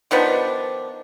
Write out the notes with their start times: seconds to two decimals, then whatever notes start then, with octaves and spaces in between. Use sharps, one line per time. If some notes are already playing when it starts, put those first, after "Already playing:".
0.11 D#3 F3 B3 D4